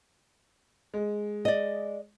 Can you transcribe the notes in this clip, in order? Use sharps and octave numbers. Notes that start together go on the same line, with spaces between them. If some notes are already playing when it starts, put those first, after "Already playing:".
G#3
D5 D#5